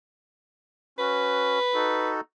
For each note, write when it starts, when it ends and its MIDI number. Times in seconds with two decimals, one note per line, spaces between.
0.99 1.59 61
0.99 1.59 66
0.99 2.13 71
1.74 2.21 63
1.74 2.21 66
1.74 2.21 69